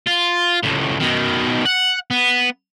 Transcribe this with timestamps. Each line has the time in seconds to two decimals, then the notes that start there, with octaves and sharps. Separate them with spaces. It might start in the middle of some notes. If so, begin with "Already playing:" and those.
0.07 F4
0.63 C#2 A2
1.01 B2 D#3
1.65 F#5
2.10 B3